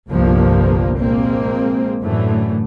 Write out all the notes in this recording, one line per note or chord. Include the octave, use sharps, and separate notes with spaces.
G1 C2 G2 A#2 F3 A#3
A#1 G#3 A#3 C4
F#2 A2 D3 E3 A3